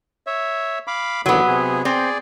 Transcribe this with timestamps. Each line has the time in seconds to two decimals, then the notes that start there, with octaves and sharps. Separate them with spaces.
0.27 C#5 E5
0.87 F5 B5 D6
1.26 D#2 D3 E3 F#3 B3
1.48 C3 G#4
1.85 C4 G#4 D5